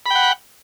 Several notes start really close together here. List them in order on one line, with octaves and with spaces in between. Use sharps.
B5 G5 F#5